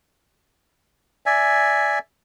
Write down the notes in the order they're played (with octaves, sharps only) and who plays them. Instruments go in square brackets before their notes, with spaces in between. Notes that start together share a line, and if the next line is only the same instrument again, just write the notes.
[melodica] D5 E5 G#5